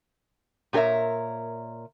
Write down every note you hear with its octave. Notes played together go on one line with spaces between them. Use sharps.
A#2 G4 A#4 C#5 E5